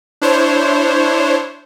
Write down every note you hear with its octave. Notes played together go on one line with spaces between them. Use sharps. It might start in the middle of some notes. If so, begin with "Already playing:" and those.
D4 E4 C5 C#5